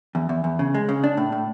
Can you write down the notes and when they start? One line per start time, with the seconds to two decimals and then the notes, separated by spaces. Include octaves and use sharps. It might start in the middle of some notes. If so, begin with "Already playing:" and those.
0.15 E2
0.29 E2
0.44 E2
0.59 C#3
0.74 G#3
0.89 C#3
1.04 D4
1.17 A2
1.32 A2